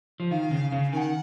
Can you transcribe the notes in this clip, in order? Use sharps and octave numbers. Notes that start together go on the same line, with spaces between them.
F3
D#3 F5
C#3
C#3
D#3 F#5 G#5